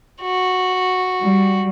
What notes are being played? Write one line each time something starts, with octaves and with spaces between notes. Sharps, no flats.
F#4
G3